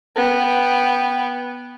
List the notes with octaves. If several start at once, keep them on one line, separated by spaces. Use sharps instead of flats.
B3 G5